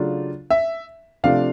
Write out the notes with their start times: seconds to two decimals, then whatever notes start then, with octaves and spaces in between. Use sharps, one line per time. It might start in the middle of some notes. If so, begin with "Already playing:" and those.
Already playing: C#3 F#3 A3 D4 F4
0.50 E5
1.24 C3 F3 A3 D4 F4 F5